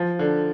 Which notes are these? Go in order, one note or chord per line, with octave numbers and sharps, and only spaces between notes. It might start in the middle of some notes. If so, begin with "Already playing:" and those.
Already playing: F3
D3